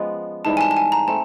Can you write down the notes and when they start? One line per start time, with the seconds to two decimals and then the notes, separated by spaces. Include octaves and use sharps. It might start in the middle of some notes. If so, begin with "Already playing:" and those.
Already playing: F3 G#3 B3 C#4
0.45 G#2 E3 G3 A5
0.57 G#5
0.61 A5
0.71 A5
0.77 G#5
0.92 A#5
1.08 A3 C4 A5